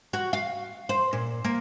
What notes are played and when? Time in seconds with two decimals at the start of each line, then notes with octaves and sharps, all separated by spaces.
0.13 F#4
0.33 F5
0.89 C5
1.13 A#2
1.44 A#3